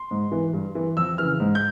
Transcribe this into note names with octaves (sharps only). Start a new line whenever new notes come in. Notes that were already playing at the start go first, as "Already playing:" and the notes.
Already playing: C6
G#2
E3
G2
E3
F2 E6
C#3 E3 F6
G#2
G6